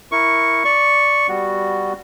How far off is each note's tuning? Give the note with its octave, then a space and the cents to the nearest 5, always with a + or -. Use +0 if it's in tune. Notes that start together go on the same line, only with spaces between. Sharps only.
E4 +0 A#4 +0 C#6 +0
D5 -10 C#6 +0
G3 +0 B3 +0 F#4 +0